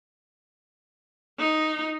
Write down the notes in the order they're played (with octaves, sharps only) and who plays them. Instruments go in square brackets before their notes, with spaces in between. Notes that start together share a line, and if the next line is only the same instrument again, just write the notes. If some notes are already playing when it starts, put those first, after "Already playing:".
[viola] D#4